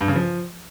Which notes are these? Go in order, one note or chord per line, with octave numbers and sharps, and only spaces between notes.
G2
C#3
F3